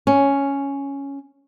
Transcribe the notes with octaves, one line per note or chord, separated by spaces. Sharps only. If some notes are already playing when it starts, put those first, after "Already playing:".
C#4